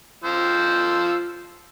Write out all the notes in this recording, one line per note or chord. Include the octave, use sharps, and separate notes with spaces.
F3 C5 E6